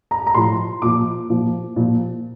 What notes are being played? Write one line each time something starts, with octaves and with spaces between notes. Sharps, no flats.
A#5
A#5
A2 F3 C6
A#2 F3 D6
A#2 F3
A#2 F3